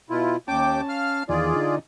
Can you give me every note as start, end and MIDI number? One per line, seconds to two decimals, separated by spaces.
0.10 0.36 47
0.10 0.36 64
0.10 0.36 65
0.48 0.81 39
0.48 1.23 61
0.48 0.81 79
0.48 1.23 81
0.48 0.81 86
0.89 1.24 77
0.89 1.24 89
1.29 1.54 40
1.29 1.54 51
1.29 1.75 65
1.29 1.75 68
1.29 1.75 74
1.56 1.79 50
1.56 1.79 63